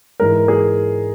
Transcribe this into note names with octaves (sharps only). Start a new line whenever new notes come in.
G#2 E3 G#3 A#4
G#4